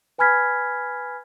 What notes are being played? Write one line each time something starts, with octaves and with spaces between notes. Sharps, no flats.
B4 G#5 B5 F6 G#6 B6